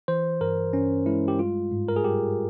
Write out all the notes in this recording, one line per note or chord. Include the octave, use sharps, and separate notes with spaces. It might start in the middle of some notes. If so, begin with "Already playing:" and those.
E3 C5
G2 A#4
G2 C#4
G#3 E4
G4
G3 F4
G#2
A#4
G#4
G3 G4